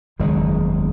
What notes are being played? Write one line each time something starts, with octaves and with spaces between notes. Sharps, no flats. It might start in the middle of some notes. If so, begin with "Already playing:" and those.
F#1 E2 D#3 G#3